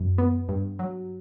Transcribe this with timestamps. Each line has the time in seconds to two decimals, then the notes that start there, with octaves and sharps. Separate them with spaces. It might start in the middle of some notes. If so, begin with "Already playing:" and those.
Already playing: F#2
0.18 B3
0.49 G2
0.79 F#3